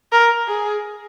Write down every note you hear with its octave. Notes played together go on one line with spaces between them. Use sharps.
A#4
G#4